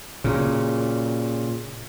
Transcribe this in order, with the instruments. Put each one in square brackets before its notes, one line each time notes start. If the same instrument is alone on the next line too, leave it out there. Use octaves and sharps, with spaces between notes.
[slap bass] A#2 C#3